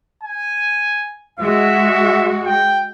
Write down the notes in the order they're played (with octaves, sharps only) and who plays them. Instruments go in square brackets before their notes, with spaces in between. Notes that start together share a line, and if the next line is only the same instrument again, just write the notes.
[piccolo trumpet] G#5
[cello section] G#3 F#4 [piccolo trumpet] E5
[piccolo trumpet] G5